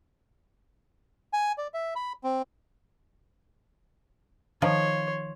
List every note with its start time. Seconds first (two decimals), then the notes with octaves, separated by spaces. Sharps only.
1.33 G#5
1.58 D5
1.74 E5
1.96 B5
2.24 C4
4.62 D#3 F3 C#5 C6